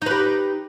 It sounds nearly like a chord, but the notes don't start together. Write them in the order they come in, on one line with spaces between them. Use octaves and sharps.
D#4 B4 G4